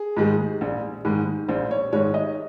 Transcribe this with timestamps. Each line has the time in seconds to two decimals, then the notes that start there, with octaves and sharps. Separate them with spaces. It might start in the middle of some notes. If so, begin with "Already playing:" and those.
Already playing: G#4
0.17 G#2 D#3 G#3
0.61 A#1
1.05 G#2 D#3 G#3
1.48 A#1 C5
1.71 C#5
1.92 G#2 D#3 G#3 C#5
2.14 D#5